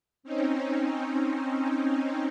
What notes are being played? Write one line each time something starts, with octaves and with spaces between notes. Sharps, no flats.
C4 C#4 D#4